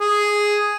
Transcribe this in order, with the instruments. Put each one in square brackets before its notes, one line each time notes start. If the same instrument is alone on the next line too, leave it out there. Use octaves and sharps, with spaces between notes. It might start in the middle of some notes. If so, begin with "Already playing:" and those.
[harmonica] G#4